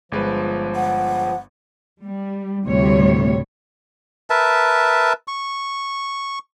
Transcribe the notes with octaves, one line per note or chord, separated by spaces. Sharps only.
G1 F3 G#3 B4
F#5
G3
D2 A2 C3 G3 C#5
A#4 B4 E5 A5
C#6